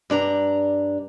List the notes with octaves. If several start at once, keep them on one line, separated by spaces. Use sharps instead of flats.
G2 D4 A#5